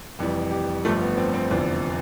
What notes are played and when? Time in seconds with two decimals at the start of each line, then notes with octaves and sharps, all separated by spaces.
0.19 F1 F2 E3 G3
0.51 G4
0.85 G1 G2 F3 A3
1.01 B3
1.17 C4
1.34 C4
1.51 F1 E2 D3 F3